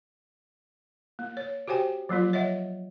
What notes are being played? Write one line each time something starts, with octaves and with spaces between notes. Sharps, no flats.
A#3
C#5
F#4 G4 C5 G5 G#5
F3 F#3 A#3 F4
C#5 D#5 E5 F#5